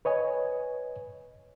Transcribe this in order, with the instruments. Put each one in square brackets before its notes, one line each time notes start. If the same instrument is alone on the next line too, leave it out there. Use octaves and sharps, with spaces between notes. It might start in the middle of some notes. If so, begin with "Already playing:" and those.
[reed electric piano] B4 C#5 D#5 G#5